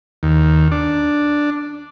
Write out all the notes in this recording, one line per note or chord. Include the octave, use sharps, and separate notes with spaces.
D#2
D4